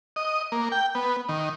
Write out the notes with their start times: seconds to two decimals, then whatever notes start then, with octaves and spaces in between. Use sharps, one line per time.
0.16 D#5
0.52 A#3
0.72 G5
0.95 B3
1.29 D#3